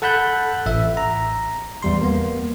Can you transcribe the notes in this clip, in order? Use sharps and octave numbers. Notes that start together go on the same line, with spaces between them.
A4 F#5 A5 B5 F#6 G6
A1 E5
A#5
E2 G3 C6
A#3 B3